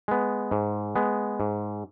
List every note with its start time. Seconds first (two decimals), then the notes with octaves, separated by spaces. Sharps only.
0.08 G#3 B3
0.51 G#2
0.96 G#3 B3
1.40 G#2